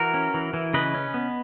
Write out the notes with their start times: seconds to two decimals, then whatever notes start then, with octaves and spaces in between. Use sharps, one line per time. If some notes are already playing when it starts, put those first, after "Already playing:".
Already playing: E3 F#4 A#4
0.14 C#4
0.34 E3
0.54 E3
0.74 C#3 B4 D#5
0.94 C#4
1.14 B3